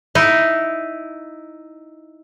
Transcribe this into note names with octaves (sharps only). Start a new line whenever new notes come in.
D#4 E4